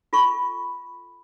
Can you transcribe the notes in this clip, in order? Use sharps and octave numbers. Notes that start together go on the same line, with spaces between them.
F4 A4 B5 C#6